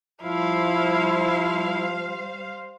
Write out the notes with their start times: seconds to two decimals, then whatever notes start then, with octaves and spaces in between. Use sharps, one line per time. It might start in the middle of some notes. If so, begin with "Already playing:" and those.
0.23 F3 G3 E4 C5 F5